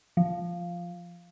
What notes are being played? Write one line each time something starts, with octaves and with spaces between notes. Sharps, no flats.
F3